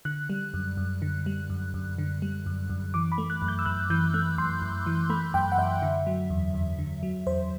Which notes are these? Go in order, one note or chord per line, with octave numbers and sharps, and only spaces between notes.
D3 F#6
G3
F#2
F#2
D3
G3
F#2
F#2
D3
G3
F#2
F#2
E3 D6
B5
A3
F#6
F#2
G6
E6
F#2 F#6
E3 G6
A3 F#6
F#2 C6
F#2
E3
A3 B5
F#2 G5
F#5
F#2 E5
D3
F#3
E2
E2
D3
F#3
E2 C5